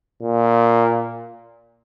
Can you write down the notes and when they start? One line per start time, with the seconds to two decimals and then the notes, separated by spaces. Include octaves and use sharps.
0.23 A#2